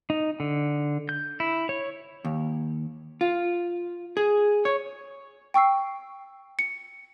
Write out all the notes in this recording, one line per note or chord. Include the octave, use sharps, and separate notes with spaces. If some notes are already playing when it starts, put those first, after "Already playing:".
D#4
D3
G6
E4
C#5
D#2
F4
G#4
C#5
G5 C#6 E6 C7
C#7